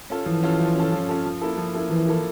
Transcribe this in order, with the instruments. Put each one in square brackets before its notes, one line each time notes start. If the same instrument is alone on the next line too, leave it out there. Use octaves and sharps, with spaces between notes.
[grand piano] C#4 F4 A4
[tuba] E3 [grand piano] F3
[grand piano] C#4 F4 A4
F3
C#4 F4 A4
F3
C#4 F4 A4
F3
A#3 E4 A4
F3
A#3 E4 A4
[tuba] E3 [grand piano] F3
[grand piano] A#3 E4 A4